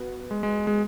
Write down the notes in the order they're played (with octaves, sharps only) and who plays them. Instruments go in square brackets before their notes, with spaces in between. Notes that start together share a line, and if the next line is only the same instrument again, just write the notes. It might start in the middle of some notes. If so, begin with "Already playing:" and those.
Already playing: [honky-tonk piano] B3 F#4
[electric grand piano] G#3
G#3
G#3